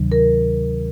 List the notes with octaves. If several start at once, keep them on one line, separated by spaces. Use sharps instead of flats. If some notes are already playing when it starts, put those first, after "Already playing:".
Already playing: D2 C3 D#3 F#3
A#4